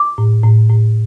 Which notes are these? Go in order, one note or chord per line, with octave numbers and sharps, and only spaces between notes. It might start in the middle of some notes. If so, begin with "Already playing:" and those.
Already playing: D6
A2
A2
A2